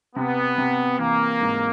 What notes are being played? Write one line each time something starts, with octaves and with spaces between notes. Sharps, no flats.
C3 B3
C3
E3 A#3
G#2